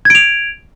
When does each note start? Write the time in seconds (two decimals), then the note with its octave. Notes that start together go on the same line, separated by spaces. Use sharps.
0.05 G#6
0.10 D7
0.15 F7